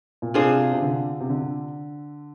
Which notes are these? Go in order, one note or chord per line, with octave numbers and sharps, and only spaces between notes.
A#2
C3 D4 F4 G#4 C5
C3
D3
C3
D3